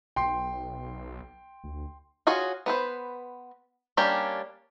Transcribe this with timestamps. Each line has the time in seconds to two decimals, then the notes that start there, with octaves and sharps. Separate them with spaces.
0.16 B1 G5 C6 C7
1.64 D2
2.27 F4 F#4 G#4 C#5
2.66 B3 B4 C5
3.97 G3 A#3 C#4 D4 G4